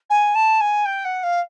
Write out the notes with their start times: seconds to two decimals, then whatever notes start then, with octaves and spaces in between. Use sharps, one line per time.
0.10 G#5
0.35 A5
0.60 G#5
0.85 G5
1.05 F#5
1.23 F5